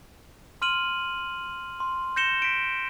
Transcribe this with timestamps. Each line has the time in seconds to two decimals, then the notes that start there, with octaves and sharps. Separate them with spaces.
0.62 C6 F6 D#7 F#7
1.80 C6
2.16 G6 A#6 C#7 E7 G7
2.42 B6 D7